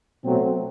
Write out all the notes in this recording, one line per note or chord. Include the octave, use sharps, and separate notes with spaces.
B2 F#3 A3 C4